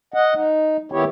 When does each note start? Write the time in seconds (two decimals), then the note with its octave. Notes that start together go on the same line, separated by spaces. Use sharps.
0.14 D#5 F#5
0.35 D#4
0.92 D#3 B3 E4 G4 C#5